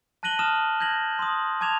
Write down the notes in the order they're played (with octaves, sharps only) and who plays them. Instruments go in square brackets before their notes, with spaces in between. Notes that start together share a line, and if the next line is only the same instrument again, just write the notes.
[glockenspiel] A5 F#6 A#6 D#7 F#7 G7
A5 D#6 F6 E7
G6 G#6 A#6 F#7
C6 D#6
A5 D6 G#6 E7 F7